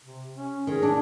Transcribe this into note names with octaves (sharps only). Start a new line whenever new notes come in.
C3
C#4
D#3 G#4
D4